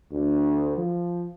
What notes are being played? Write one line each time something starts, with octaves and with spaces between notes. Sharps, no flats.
D2
F3